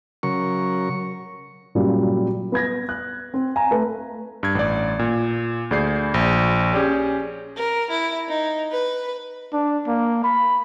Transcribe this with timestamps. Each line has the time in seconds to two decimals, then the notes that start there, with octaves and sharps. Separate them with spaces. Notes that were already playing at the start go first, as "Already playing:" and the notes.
0.23 C#3 F#3 A#4 C#6
1.75 A#2 C#3 F#3 G3
2.52 B3 B5 G#6 A#6
2.89 F#6
3.34 C4
3.56 F5 G#5 A#5
3.71 A3 B4
4.43 G2 G#6
4.55 A1 D5
4.99 A#2
5.71 D2 G#4 D5 G6 C7
6.14 A#1
6.73 C#4 G4 G#4 D5
7.56 A#4
7.91 E4
8.29 D#4
8.72 B4
9.53 D4
9.87 A#3
10.24 B5